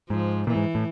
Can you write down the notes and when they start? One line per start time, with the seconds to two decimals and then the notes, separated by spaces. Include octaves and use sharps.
0.10 G#2 F3
0.47 A#2 E3
0.56 G#2
0.75 A2